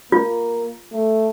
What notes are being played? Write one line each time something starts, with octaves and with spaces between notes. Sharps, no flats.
A#3 F4
A3